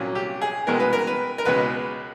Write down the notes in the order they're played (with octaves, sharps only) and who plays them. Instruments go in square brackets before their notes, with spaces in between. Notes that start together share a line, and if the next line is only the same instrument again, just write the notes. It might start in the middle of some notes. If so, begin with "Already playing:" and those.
Already playing: [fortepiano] C2 A#2 F#3 A#3 C#4
G4
G#4
C2 B2 G#3 B3 A#4
B4
A#4
B4
A#4
C#2 B2 G#3 B4